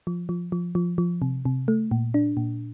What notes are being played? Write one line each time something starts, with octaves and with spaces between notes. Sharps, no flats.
F3
F3
F3
F3
F3
C3
C3
A3
A#2
D4
A#2